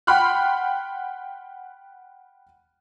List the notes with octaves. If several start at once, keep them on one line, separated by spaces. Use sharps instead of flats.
F#5 G5 B5 C6 F6 F#6